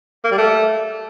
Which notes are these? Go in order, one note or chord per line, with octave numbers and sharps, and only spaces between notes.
A#3
G3
A3